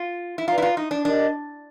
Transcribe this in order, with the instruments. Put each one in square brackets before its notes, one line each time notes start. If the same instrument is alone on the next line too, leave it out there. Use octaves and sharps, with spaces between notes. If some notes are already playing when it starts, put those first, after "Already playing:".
Already playing: [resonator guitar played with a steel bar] F4
E4
[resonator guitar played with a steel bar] F4 [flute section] B4 D5 F5 A#5
[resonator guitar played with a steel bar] E4
F4
D#4
D4
[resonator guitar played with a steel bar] D4 [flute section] G4 A#4 D#5